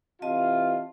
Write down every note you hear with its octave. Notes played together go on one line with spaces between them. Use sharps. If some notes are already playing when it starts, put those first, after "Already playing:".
C3 E3 F4 D#5 A5